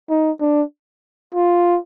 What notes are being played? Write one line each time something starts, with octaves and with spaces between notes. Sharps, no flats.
D#4
D4
F4